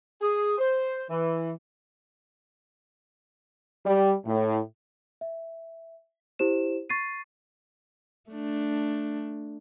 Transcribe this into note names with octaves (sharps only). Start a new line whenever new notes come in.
G#4
C5
E3
G3
A2
E5
E4 G4 C5 E7
C#6 A6 C7 D#7
A3 D4